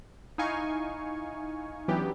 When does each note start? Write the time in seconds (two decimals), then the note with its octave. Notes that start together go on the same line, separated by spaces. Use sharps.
0.38 D#4 E4 F5 G#5 C#6
1.88 E3 F#3 B3 C#4 D4 G4